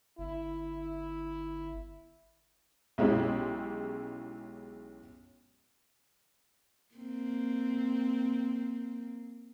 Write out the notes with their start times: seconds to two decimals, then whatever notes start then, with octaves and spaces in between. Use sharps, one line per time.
0.18 G1 E4
2.98 B1 G#3 C#4 E4 G4
6.95 A#3 C4